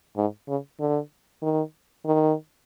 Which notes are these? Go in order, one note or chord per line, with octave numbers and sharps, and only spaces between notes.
G#2
C#3
D3
D#3
D#3